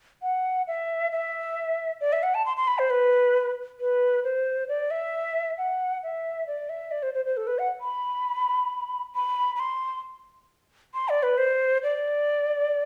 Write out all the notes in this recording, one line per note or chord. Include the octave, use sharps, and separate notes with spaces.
F#5
E5
E5
D5
E5
F#5
A5
C6
C6
B5
C5
B4
B4
C5
D5
E5
F#5
E5
D5
E5
D5
C5
C5
C5
A4
B4
F#5
B5
B5
B5
C6
C6
D5
B4
C5
D5